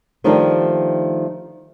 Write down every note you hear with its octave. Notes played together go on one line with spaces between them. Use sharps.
D#3 F3 G3 A3 D4 D#4